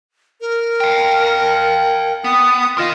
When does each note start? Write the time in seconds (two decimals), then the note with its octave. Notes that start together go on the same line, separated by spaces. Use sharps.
0.41 A#4
0.80 F5 G5
2.24 B3 D#6
2.78 F4 A#4 D#5